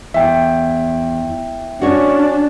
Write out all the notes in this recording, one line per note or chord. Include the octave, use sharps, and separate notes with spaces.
E2 E5 G5
C#4 D4 F#4 C#5